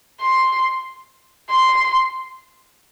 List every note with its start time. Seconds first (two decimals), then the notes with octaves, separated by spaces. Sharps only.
0.21 C6
1.50 C6